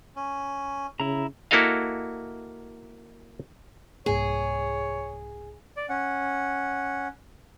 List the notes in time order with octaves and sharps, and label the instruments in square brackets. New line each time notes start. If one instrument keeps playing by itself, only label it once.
[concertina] C#4
[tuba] C#3 [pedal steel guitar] E4 A#5
[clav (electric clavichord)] A#3 E4 F#4 A4 D#5 F5
[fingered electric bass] C2 G#2 A#3 [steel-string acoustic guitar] G#4 [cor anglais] C#5
[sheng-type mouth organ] D5
C#4 F#5